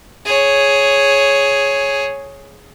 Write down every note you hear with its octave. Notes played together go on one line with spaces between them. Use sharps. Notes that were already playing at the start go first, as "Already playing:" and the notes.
G#4 C#5